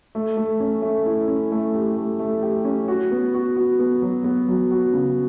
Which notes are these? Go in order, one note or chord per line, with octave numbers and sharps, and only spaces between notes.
A3
A3
C#4
A3
E4
C#4
A3
G4
A3
A3
G4
C#4
F#4
B3
F#4
F#4
B3
F#3
B3
F#3
F#4
C#3